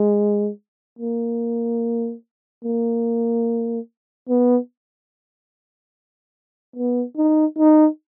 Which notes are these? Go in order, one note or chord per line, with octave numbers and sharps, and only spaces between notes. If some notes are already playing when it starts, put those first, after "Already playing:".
Already playing: G#3
A#3
A#3
B3
B3
D#4
D#4